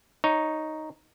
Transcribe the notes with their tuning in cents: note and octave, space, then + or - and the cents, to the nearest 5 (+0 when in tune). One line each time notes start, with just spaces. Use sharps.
D#4 +0 C#5 +0